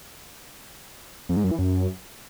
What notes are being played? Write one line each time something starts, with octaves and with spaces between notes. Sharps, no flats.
F2
G#2
F#2
E3
F#2